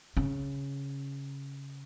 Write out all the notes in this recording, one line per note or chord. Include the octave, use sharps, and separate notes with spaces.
C#3